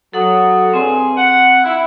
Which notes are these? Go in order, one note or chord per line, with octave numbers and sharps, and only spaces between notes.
F#3 A4 F#5 D#6
G2 C4 G#4
F#5
E4